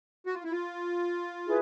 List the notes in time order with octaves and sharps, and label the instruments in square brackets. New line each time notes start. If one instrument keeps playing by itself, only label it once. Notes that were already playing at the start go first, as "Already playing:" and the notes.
[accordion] F#4
F4
E4
F4
[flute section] E4 G#4 B4